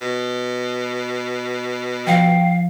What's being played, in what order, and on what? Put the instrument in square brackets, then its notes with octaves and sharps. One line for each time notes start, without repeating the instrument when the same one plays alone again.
[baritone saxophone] B2
[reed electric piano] F3 [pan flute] F5 [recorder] G5